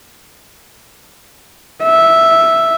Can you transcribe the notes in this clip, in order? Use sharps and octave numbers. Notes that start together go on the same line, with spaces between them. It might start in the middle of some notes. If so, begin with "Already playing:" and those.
E5